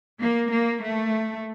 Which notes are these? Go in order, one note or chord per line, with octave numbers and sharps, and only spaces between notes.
A#3
A#3
A3